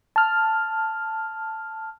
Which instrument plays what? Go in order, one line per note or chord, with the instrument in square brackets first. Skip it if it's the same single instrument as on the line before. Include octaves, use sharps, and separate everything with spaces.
[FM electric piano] A5 F6